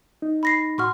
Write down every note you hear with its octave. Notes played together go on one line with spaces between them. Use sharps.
D#4
B5 A#6 C7
A2 F#4 F#5 C6 C#6 F6